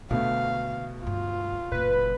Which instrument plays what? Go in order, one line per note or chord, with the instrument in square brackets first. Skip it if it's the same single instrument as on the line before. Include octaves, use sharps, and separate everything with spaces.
[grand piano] B2 A3 B3 [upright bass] D3 [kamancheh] F5
[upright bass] D2 G2 [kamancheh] F4
[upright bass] F#1 A#2 [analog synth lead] B4